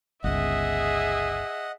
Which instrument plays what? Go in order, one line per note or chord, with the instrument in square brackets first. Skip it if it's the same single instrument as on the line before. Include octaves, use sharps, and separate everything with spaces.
[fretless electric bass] G1 C#2 [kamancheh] G#4 E5 [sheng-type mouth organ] D#5 F#5